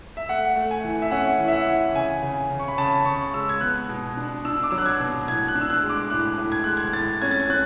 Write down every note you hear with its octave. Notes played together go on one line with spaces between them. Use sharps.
E5
A3 F#5
A3
G#5
E3
E5
C#4 F#5
E3
E5
F#5
E3
C#3 G#5
C#3
C#3
C#6
B5
C#3 A5
C#3 C#6
G#3 E6
G#6
B3 F#6
B2
D4
D4 E6
D6
F#3 E6
F#6
G#6
B2
A2 G#6
F#6
D4
E6
F#6
G#3
D6
A2 F#6
A2
G#6
G#3 F#6
G#6
A2 A6
C#4 G#6
A6
G#6
C#4 F#6